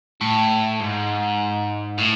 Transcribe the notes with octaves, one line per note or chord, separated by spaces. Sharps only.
A2
G#2
A2